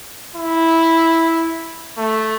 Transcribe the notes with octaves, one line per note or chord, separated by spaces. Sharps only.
E4
A3